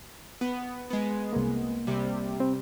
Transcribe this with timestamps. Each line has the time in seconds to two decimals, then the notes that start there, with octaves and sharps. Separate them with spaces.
0.41 B3
0.90 G#3 B3
1.33 C2 A#3
1.87 C3 G3
2.40 C4